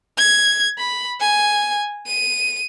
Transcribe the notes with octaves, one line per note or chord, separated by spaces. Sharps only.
G#6
B5
G#5
D#7